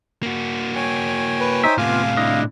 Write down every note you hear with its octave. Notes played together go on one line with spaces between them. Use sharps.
A#3 F#4
C#5 G5 G#5
B4
D#4 C5 E5
A2 C3 B3 F4 F5 G#5 D6
D4 E4 D#5